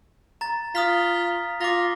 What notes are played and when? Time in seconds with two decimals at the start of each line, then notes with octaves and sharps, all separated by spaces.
0.41 A#5 A6
0.75 F4 D#6 F6 B6
1.61 F4 D6 A#6